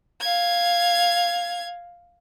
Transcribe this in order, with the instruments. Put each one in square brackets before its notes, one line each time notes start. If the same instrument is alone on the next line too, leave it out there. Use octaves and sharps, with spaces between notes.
[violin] F5 G#6